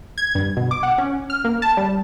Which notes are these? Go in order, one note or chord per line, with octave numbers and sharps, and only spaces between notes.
G#6
G2
B2
D6
F#5
C#4
F6
A#3
A5
G3